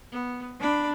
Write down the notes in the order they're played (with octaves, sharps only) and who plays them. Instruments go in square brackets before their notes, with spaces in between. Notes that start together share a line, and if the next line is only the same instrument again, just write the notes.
[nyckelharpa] B3
[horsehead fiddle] D4 [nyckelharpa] D5 B5